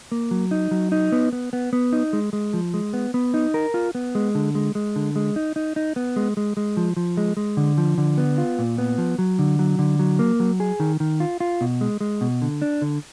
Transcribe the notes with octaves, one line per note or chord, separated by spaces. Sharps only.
A#3
F#3
D#4
F#3
D#4
B3
B3
B3
B3
D#4
G#3
G#3
F3
G#3
B3
B3
D#4
A#4
F4
B3
G#3
D3
G#3
G#3
D3
G#3
D#4
D#4
D#4
B3
G#3
G#3
G#3
F3
F3
G#3
G#3
D3
F3
D3
B3
F4
A#2
B3
F3
F#3
D3
F#3
D3
F#3
A#3
F#3
G#4
D#3
D#3
F4
F4
B2
G#3
G#3
B2
D3
D4
D3